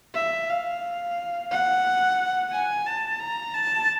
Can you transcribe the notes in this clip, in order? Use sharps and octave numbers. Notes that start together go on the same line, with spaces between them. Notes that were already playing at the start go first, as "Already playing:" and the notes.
E5
F5
F#5
G#5
A5
A#5
A5